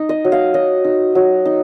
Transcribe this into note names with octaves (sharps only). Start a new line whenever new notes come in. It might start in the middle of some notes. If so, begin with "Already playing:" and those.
Already playing: D#4
D#5
F#3
F5
F#3 D#5
D#4
F#3
D#4